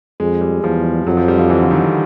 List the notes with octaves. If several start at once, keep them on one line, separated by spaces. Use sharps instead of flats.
F2 G#3
G3
E2 F3
F2 F#3
F3
G3
F3
E3
D3
D#3